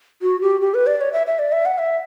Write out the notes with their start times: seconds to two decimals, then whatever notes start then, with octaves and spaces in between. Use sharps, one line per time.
0.22 F#4
0.41 G4
0.61 G4
0.74 B4
0.87 D5
1.01 C#5
1.13 E5
1.27 E5
1.39 D5
1.52 E5
1.66 F#5
1.78 E5